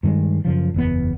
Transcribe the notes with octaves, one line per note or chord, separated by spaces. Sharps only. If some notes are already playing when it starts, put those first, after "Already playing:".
G2 D#3 F#3 G#3
F#2 C#3 F3
F#1 E2 B3